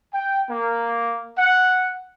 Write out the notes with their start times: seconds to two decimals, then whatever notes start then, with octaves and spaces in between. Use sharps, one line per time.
0.13 G5
0.48 A#3
1.37 F#5